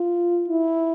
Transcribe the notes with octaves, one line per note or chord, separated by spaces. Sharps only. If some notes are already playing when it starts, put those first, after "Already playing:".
Already playing: F4
E4